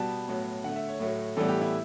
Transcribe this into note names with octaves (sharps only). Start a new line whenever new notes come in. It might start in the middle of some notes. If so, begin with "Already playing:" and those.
Already playing: B2 G3 B3 A5
A2 F#3 B3
D3 F#5
A3
E5
C#5
A2 F#3 A3
A2 E3 G3 B3 A4
G4
E4